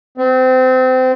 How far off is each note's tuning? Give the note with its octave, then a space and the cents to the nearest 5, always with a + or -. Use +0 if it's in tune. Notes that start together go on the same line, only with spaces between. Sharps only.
C4 -25